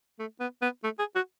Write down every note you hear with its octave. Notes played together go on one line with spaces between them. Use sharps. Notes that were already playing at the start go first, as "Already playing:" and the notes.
A3
B3
B3
A3
G#4
F#4